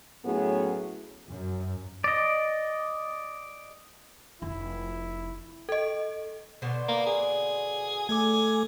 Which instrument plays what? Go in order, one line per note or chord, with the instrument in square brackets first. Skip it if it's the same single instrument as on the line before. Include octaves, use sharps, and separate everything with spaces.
[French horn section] A2 F#3 B3 C#4 G#4
[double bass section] F#2
[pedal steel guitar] D5 D#5
[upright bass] F1 [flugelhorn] E4
[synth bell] A4 D#5
[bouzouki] B2 D3 C5
[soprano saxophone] A#3
G#4
[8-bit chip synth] A3 A4 D6 [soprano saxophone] G#5